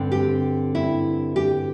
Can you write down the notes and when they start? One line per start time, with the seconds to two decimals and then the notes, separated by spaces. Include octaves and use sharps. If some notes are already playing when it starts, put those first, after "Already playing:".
Already playing: G2 D3 C4
0.12 G4
0.75 E4
1.36 G4